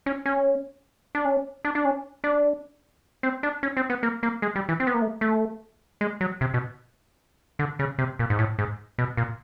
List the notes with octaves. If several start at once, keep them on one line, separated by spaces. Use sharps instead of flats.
C#4
C#4
D4
C#4
D4
D4
C#4
D4
C4
D4
C#4
C4
B3
A#3
A#3
G#3
G3
E3
C4
B3
A#3
A3
A3
G#3
F#3
C3
B2
D3
C#3
C3
A#2
G#2
A2
G#2
B2
A#2